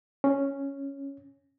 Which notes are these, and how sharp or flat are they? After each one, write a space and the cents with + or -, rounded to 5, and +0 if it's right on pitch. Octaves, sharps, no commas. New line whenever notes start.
C#4 +0